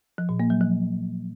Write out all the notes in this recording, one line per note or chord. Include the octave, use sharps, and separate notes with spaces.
F3
A#2
A#3
F#3
F3